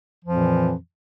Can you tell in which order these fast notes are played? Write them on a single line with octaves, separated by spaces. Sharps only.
F3 F2 A#2 E3